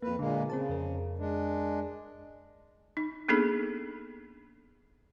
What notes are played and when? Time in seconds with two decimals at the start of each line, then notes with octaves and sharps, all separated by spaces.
0.02 F2 A#3 F4 B4
0.19 A#2 D3 G#3 A#3
0.50 C#3 C4 C5 A5
0.69 F2 A#4
1.19 G#3 D4
2.97 D#4
3.29 A#3 B3 D4 D#4 G#4 A4